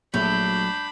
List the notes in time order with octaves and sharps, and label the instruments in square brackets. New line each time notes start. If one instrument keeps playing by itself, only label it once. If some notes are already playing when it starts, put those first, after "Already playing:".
[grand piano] A#1 A3 E5 [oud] F#3 [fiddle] D4 B5 [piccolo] G6